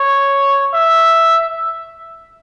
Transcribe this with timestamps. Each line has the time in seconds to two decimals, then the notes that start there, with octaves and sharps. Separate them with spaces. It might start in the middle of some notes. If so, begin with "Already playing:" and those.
Already playing: C#5
0.74 E5